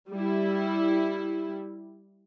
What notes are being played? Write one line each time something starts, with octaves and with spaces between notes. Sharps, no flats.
G3 E4